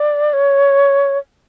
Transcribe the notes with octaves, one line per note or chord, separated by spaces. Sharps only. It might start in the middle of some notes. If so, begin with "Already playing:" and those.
Already playing: D5
C#5